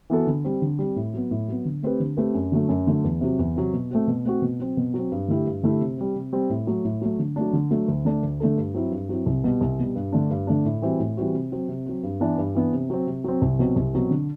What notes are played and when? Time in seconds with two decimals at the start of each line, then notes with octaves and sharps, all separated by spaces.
0.10 E3 B3 F#4 A4
0.27 D3
0.44 G3 C4
0.62 D3
0.79 G3 C4
0.96 A2
1.14 F#3 B3
1.31 A2
1.48 F#3 B3
1.65 D3
1.83 A3 C4 G4 B4
2.00 D3
2.17 A3 C4 G4 B4
2.34 F#2
2.52 D3 F#3 A3
2.69 F#2
2.87 D3 F#3 A3
3.04 E2
3.21 C3 F#3
3.39 E2
3.56 C3 F#3
3.73 B2
3.90 A3 C4 F#4
4.07 B2
4.25 A3 C4 F#4
4.42 B2
4.59 F#3 C4
4.77 B2
4.94 F#3
4.99 C4
5.12 G2
5.28 D3 A3 E4 G4
5.46 G2
5.63 D3 A3 E4 G4
5.81 C3
5.97 G3 C4
6.16 C3
6.33 G3 C4
6.50 A2
6.67 F#3 A3
6.85 A2
7.02 F#3 A3
7.19 D3
7.36 F#3 A3 D4
7.53 D3
7.71 F#3 A3 D4
7.88 D2
8.05 D3 A3 D4 A4
8.23 D2
8.40 D3 A3 D4 A4
8.57 G2
8.75 F#3 C4 E4
8.91 G2
9.09 F#3 C4 E4
9.26 C2
9.44 B2 G3
9.61 C2
9.79 B2 G3
9.95 G2
10.12 D3 A3 D4
10.30 G2
10.47 D3 A3 D4
10.65 A2
10.82 E3 G3 C4 F#4
11.00 A2
11.17 E3 G3 C4 F#4
11.34 C3
11.52 F#3 C4
11.69 C3
11.86 F#3 C4
12.03 G2
12.20 E3 B3 D4
12.38 G2
12.55 E3 B3 D4
12.73 C3
12.90 F#3 C4
13.07 C3
13.24 F#3 C4
13.42 C2
13.59 B2 F#3 C4
13.76 C2
13.94 B2 F#3 C4
14.11 D3